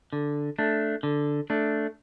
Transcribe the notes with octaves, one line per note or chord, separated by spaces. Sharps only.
D3
A3 D4
D3
A3 D4